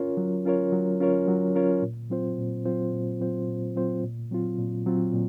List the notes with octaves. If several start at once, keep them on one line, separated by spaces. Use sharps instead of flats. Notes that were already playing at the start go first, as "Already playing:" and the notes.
Already playing: C#4 F4 A#4 C#5
F#3
C#4 F4 A#4 C#5
F#3
C#4 F4 A#4 C#5
F#3
C#4 F4 A#4 C#5
A#2
F#3 C4 F4 C5
A#2
F#3 C4 F4 C5
A#2
F#3 C4 F4 C5
A#2
F#3 C4 F4 C5
A#2
F#3 C4 F4
A#2
F#3 C4 F4
A#2